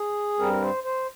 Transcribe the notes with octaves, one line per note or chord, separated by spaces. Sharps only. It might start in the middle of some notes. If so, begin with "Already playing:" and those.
Already playing: G#4
G2 G3 C4 A#4
C5
C5